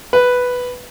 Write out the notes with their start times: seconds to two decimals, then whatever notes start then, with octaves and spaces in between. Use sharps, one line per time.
0.13 B4